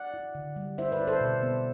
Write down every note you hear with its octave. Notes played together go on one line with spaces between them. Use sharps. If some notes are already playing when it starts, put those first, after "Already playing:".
Already playing: D5 F#5
E4
D3
G3
E4 C5 E5
B4 D5
E4
A4 C5
B2
B3